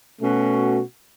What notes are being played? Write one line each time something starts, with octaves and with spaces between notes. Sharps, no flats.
B2 A3 C#4 F#4